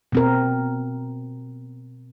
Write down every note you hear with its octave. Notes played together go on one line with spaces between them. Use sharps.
B2 C4 A#4